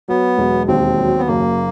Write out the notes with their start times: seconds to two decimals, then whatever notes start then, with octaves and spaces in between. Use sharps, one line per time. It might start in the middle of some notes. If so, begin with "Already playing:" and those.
0.08 F#3 B3
0.38 E1
0.68 D#2 C4
0.99 F#3
1.19 B3
1.27 F#1 A#3